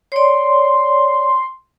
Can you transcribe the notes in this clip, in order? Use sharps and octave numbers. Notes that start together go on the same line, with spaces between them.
C#5 D5 C6